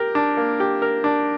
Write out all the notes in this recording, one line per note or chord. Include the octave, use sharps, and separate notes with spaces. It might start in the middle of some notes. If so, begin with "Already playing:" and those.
Already playing: G4 A#4
D4
A#3
G4
A#4
D4